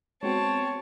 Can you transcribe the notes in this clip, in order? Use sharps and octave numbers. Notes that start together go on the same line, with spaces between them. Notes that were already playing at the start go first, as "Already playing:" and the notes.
G#3 B3 C4 F#4 C#5 A5